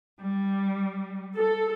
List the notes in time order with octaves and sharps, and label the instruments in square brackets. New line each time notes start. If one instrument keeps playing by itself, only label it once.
[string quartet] G3
[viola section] A4